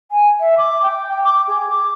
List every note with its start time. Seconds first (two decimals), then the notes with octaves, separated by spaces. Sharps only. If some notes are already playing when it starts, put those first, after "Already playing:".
0.11 G#5
0.40 E5
0.58 D6
0.83 G5
1.24 D6
1.48 G#4
1.70 D6